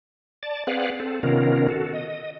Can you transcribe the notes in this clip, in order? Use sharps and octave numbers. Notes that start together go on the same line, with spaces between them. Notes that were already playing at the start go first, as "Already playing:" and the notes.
D5 A5
C4 G#4 B4 D5 F5 F#5
C4 A4
C3 D#3 B3 C#4 F4 A#4
F#4 A4
D#5